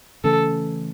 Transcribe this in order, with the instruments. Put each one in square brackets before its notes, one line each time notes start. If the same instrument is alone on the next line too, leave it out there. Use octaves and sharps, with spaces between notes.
[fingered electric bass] C#3 E3 A3 C#4 [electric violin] A4